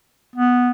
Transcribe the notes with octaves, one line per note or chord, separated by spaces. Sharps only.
B3